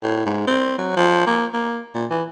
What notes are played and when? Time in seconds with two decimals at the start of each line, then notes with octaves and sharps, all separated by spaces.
0.03 A2
0.26 G#2
0.48 C4
0.78 F#3
0.96 F3
1.26 A#3
1.54 A#3
1.95 A#2
2.11 E3